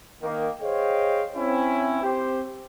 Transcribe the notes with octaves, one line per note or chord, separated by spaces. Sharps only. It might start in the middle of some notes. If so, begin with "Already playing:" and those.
D#3 A#3
G#4 C5 C#5 D#5 F5 G5
C4 C#4 E4
C4 G4 C5